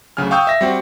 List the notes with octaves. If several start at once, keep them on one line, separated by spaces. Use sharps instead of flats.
D2 C#3 F#3 G#5 F6
F5 G5 C#6 D#6 E6 G6
E5 A#6
G3 C4 F#4